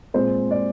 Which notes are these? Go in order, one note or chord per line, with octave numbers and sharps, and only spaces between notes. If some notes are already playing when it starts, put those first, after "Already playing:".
A#2 G#3 C4 C5
D5